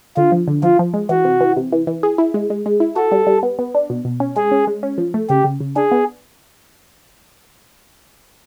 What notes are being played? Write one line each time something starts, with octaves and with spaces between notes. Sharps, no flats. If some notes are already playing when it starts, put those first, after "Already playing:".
D3 F4
F3
D3
F3 F4
F3
G#3
E3 F#4
C3
E3
C3
E3
E3
G#4
E4
G#3
G#3
G#3
E4
F#4 A4
G3
G3
B3
B3
D4
B2
B2
C#4
G#3 G#4
C#4
G#3
C#4
F3
A3
C#3 G4
C#3
C#3
D4 G#4
B3